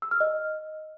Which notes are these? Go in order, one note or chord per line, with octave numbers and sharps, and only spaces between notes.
E6
F6
D#5